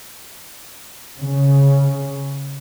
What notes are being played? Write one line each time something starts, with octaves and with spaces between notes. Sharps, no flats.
C#3